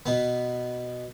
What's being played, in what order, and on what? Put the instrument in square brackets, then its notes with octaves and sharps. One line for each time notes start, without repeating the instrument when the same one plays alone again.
[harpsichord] B2 B3